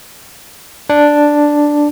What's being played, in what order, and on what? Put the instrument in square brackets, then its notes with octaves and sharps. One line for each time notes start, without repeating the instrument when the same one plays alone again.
[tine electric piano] D4